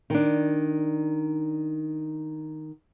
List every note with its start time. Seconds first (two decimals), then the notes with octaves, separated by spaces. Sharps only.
0.10 D#3 D4